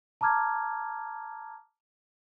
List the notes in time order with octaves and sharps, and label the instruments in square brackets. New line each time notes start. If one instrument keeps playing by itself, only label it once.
[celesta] A5 A#5 D6 F6 G#6